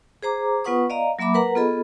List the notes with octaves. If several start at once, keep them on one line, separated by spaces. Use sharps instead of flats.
G#4 C5 A#5 D6
B3 F4 B4 F#5 C#6 D#6
D5 D#5 F5 A#5
F#3 A#3 E5 B5 D6
A#4 B4 F#5 A#5
B3 F4 G#4 A4 D#5 B5